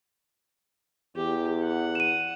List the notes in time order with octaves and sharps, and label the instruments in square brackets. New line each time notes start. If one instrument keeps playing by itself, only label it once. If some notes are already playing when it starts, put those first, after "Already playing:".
[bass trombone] E2 [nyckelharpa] G4
[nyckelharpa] F#5
[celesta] D#7 E7